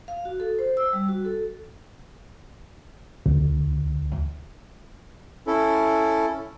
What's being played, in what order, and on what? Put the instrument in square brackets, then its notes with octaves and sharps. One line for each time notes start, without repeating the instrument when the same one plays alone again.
[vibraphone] F5
F#4
A4
C5
E6
G3
F#4
A4
[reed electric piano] D2
[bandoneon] C#4 E4 A4